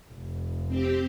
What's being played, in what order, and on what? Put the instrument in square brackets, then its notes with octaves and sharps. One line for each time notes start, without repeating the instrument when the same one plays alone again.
[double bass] F1
[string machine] C4 G4